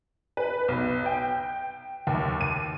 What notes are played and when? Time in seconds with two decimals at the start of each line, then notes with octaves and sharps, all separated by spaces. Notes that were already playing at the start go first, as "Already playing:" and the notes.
0.37 B4
0.68 B1
1.06 G5
2.07 D#2
2.41 D#7